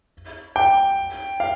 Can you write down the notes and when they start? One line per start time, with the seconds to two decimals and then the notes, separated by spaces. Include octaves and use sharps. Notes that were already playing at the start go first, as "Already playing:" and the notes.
0.56 G5
1.40 F5